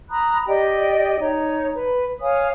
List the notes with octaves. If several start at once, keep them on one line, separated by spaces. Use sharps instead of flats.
A#5 B5 D#6 F#6
G4 D5 D#5 G5
D#4 C#5
B4
C#5 F5 G#5 D#6